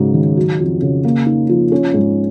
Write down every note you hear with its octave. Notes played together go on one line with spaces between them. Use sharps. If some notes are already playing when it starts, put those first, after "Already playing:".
Already playing: G#2 C#3 F#3
D#3
F#3
F2
C#3
A#3
D#4
F3
C#4
G#2